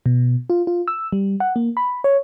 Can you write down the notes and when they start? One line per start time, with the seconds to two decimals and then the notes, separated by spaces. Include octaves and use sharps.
0.06 B2
0.50 F4
0.67 F4
0.88 E6
1.12 G3
1.40 F#5
1.56 A#3
1.77 B5
2.04 C#5